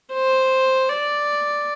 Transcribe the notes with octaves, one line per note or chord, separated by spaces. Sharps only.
C5
D5